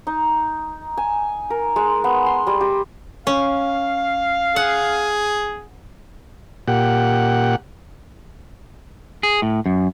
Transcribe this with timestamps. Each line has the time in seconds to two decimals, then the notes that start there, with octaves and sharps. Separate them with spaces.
0.07 D#4
0.97 G#5
1.50 A#4
1.76 G#3
2.04 B3
2.26 C6
2.47 G3
2.61 G4
3.27 C#4 F5
4.56 G#4 F#5
6.68 A#2 G4 F#5
9.23 G#4
9.42 A2
9.66 F#2